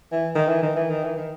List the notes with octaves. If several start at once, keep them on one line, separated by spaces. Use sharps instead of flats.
E3
D#3
E3
D#3
E3
D#3
E3
D#3